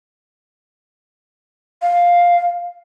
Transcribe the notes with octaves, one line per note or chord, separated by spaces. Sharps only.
F5